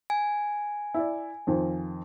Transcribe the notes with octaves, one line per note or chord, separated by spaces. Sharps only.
G#5
E4 D5
F2 D#3 F3